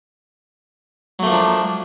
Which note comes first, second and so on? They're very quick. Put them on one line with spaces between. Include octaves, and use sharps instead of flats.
F#3 A3 A#3 F3 D4